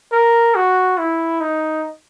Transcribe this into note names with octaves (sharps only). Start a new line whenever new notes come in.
A#4
F#4
E4
D#4